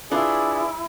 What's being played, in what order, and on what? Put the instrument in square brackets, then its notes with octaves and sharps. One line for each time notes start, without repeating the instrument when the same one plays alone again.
[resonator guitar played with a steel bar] D4 F4 B4 [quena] E4 [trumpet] G#4